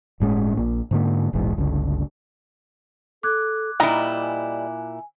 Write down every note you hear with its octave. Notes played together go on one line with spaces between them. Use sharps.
G1 A2 G#3 C#4
A#1 A#3
G#2 D3 A#3
E1 A#1 E2 G#2
G1 C#2 D3
A4 D6 F#6 G#6
A#2 G3 D#4 E4 D#5 A#5
G#5